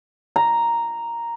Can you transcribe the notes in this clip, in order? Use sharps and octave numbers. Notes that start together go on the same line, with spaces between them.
A#5